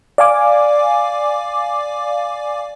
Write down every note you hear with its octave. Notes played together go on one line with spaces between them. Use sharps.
D5 F5 G#5 D6